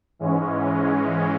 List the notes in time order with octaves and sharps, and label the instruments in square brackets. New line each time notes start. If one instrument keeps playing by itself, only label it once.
[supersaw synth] G#2 E3 G#3 C#4